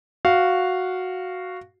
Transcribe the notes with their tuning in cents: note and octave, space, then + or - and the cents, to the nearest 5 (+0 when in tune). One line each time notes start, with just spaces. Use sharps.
F#4 -5 F5 -5